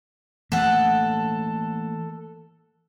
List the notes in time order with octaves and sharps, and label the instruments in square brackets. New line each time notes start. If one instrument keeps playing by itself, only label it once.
[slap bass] E3 A3 A#3 [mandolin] A4 F#5